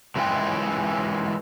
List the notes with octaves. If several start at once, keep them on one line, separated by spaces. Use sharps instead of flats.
A#2 E3 G#3 E4 F4 G5